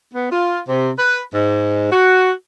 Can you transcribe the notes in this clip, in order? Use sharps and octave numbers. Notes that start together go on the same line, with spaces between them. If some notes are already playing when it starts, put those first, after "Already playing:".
B3
F4
C3
B4
G#2
F#4